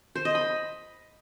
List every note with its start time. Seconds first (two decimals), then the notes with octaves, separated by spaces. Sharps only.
0.15 C5
0.25 D#5
0.35 B5